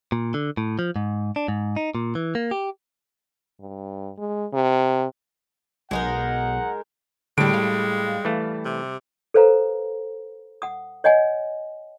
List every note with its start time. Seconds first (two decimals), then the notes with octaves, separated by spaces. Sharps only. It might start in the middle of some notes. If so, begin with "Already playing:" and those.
0.12 A#2
0.34 D3
0.57 A2
0.79 F3
0.96 G#2
1.36 D4
1.48 G#2
1.76 D#4
1.95 A#2
2.15 E3
2.35 A#3
2.51 G4
3.60 G2
4.18 G#3
4.53 C3
5.91 B1 G#3 D#4 A#4 F#5
7.38 A2 D3 G3 G#3 D7
7.54 F5
8.25 E3 A3
8.65 C3
9.34 A4 B4 C5 F5 A#5
10.62 F#5 D#6
11.04 C#5 D#5 F#5 G#5